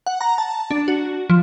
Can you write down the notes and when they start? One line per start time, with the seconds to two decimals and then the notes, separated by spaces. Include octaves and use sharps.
0.06 F#5
0.21 A#5
0.38 A5
0.71 D4
0.88 F#4
1.30 F3